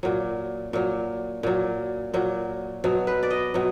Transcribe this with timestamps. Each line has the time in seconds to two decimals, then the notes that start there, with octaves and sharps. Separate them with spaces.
0.03 A#2 F#3
0.73 A#2 F#3
1.43 A#2 F#3
2.14 A#2 F#3
2.84 B2 F#3
3.07 B4
3.23 D5
3.30 D#5
3.54 B2 F#3